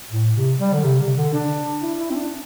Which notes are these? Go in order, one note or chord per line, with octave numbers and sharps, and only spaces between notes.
A2
C3
G3
D3
C3
C3
D3
D4
E4
E4
C4
D4